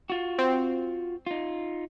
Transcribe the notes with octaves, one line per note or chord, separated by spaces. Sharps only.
F4 F#4
C4
D#4 F4